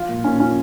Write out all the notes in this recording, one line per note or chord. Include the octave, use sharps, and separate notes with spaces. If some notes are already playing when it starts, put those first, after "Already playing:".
Already playing: F3 F4
A#2
A#2 C#4
F3 C#4